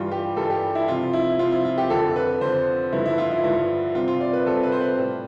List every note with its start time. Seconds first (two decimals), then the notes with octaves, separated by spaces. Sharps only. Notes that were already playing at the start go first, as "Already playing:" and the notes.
Already playing: G2 E3 G3 F4
0.12 G4
0.37 G2 E3 G3 A4
0.50 G4
0.75 E4
0.88 C3 F3 C4 F4
1.13 E4
1.39 C3 F3 C4 F4
1.52 E4
1.65 F4
1.78 G4
1.90 F2 D3 F3 A4
2.16 B4
2.41 F2 D3 F3 C5
2.93 G2 D3 F3 B3 E4
3.06 E4
3.18 F4
3.31 E4
3.44 G2 D3 F3 B3 E4
3.95 C3 G3 C4 F4
4.08 F4
4.21 D5
4.33 B4
4.46 C3 G3 C4 A4
4.63 B4
4.72 C5
4.80 B4
4.97 A2 G3 B3